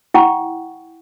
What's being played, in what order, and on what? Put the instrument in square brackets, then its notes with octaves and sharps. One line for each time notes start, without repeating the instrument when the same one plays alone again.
[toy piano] E4 F#5 G5 C#6